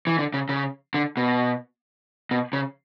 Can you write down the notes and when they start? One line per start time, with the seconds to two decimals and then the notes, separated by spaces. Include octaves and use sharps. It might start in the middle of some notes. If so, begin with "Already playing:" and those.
0.07 E3
0.18 D3
0.34 C#3
0.49 C#3
0.94 D3
1.17 B2
2.31 B2
2.53 C#3